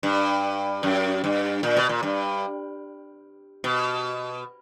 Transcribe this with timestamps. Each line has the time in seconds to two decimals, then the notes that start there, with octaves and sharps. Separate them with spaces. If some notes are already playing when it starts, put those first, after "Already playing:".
0.03 G2
0.83 F#2
1.24 G2
1.63 A#2
1.77 B2
1.89 A#2
2.03 G2
3.64 B2